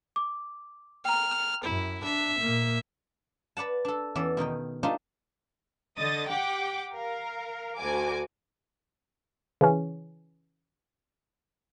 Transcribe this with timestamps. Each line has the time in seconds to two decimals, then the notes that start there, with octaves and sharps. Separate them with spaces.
0.16 D6
1.05 G5 A#5 F6
1.63 F#2 E4
2.04 D4 E5
2.40 A#2 A#3
3.57 B4 D5 F#5 A5
3.85 D4 A4
4.15 E2 E3 C#4 D5 E5
4.37 B2 D#3 D#4 G5
4.83 A3 D4 D#4 F4 G4 C5
5.98 D3 D#5 D#6 A6
6.28 G4 F#5 G5 D6
6.95 A#4 F5
7.78 D2 F#4 G#5 D6
9.61 C#3 E3 C#4